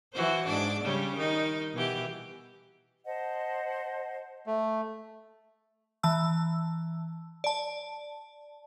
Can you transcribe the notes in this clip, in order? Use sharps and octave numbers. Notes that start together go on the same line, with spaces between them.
E3 F#4 C5
G#2 D4 D5
C#3 G3 C#4
D#3 D#4
B2 E3 G4
C5 D#5 F#5 A5
A3
E3 A5 E6
D5 A5